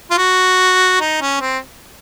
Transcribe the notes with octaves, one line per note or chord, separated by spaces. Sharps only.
F4
F#4
D#4
C#4
C4